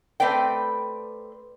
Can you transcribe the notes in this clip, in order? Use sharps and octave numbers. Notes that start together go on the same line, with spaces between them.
A3 C4 B4 D5 G5